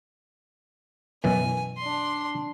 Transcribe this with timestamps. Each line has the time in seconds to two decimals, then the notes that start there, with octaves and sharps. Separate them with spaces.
1.24 F#2 B2 E3 G#5
1.78 D4 C6